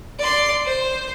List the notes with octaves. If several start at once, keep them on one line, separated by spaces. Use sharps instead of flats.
D5 C6
C5